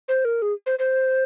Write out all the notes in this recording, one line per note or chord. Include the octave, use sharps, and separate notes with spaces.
C5
A#4
G#4
C5
C5